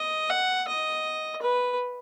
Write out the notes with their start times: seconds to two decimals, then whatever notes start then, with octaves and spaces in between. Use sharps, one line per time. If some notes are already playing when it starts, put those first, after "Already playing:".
Already playing: D#5
0.30 F#5
0.67 D#5
1.42 B4